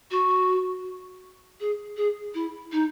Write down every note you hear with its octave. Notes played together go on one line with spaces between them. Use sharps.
F#4
G#4
G#4
E4
D#4